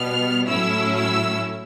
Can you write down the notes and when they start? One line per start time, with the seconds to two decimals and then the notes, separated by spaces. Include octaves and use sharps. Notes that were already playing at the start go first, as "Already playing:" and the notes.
Already playing: B2 G3 B3 F6
0.48 A2 F#3 A3 C#4 E4 E6
0.95 E6